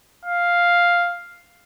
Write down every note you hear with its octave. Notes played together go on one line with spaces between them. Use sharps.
F5